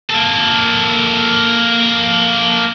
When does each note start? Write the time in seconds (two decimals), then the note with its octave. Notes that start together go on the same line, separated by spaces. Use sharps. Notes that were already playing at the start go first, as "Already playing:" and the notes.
0.10 A#3 A4